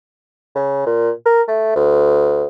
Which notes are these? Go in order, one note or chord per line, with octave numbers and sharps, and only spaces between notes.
C#3
A#2
A#4
A3
D2